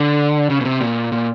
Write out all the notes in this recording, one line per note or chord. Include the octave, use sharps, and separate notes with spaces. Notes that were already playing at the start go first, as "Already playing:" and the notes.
Already playing: D3
C#3
B2
C3
A#2
A#2